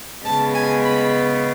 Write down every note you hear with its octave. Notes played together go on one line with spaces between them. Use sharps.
C#3 G#3 B3 A5
G#5
B5